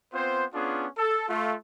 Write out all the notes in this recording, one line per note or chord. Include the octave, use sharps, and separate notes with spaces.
B3 C4 F4 C5
B3 C#4 D4 F4 G#4
A4
A3 F4